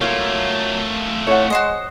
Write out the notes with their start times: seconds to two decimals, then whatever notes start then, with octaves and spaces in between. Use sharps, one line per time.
0.01 F#3 A3 A#3 E4 F4
1.27 A2 C#5 F#5
1.50 G#3 F#4 C5 D#5